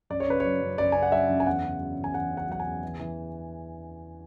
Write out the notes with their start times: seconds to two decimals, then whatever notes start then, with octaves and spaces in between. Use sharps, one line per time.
0.10 F#2 D5
0.20 C#5
0.28 C#3 B4
0.40 F#3 C#5
0.61 F#2
0.78 F#2 D5
0.92 C#3 G#5
1.03 F#5
1.12 F#3 E5
1.29 F#2
1.40 G#5
1.46 E2 F#5
1.63 C#3
1.80 F#3
1.98 E2
2.04 G#5
2.14 E2 F#5
2.31 C#3
2.37 F#5
2.48 F#3 F#5
2.60 G#5
2.65 E2
2.83 E3
3.00 E3